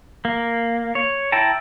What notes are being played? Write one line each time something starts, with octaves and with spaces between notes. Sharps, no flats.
A#3
C#5
E4 G5 A5 A#5